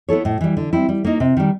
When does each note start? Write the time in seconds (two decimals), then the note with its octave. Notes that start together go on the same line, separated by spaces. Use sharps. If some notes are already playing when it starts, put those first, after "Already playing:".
0.09 B3 E4 A4 C#5
0.25 A2
0.41 E3 G3
0.57 D3
0.73 G3 C4 E4
0.89 G3
1.05 A#3 D#4
1.20 C3
1.37 D#3 G3